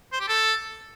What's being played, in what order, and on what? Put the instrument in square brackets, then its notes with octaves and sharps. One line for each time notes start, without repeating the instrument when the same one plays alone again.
[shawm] C5
G4
A4